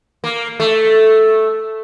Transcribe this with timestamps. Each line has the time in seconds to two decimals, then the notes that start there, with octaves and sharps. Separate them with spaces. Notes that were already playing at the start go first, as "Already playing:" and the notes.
0.24 A#3
0.60 A3